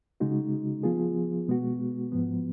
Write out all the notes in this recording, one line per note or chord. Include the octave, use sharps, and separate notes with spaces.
C#3 G#3 D#4 F#4
F3 B3 F4 G#4
B2 G#3 B3 F#4
G#2 F3 B3